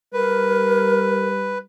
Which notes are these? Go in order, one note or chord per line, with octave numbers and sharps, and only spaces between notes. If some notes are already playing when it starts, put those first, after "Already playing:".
G3 A#4 B4